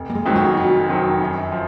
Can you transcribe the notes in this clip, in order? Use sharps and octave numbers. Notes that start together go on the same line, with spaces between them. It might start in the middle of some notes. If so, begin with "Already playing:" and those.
Already playing: F1
A#3
G#3
F2 D#3 F#3 C4
F#4
F1 F#4
F2 D#3 F#3 C4
F#2
F3